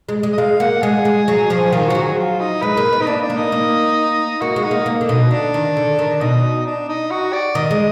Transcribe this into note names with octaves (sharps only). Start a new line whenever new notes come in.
G#3
G#3
D#5
G#3 F5
A#3 F#5
G#3 G#4
G#3
F#3
F3
D#3 F4
F3 F#4
F#3
G#4
F4
D#4
G#3 B4
A#3
B3
D#4
A#3 D4
D4
A#3
D#4
A#3
A#3 F#4
G#3
D#4
A#3
A#3
D3
B2 D#4
D3 D4
D#3
D3
D#3
B2 D#4
D4
D#4
F#4
D5
D#3 D#5
G#3